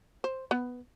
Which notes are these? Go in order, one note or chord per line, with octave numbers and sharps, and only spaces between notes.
C5
B3